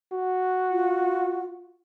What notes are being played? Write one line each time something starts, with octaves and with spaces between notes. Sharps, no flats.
F#4
F4